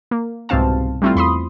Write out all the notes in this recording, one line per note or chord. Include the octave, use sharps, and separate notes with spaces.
A#3
C2 G#2 B2 C4 F5 A5
G3 A3 C4 E4 F4
E2 B5 C6 D#6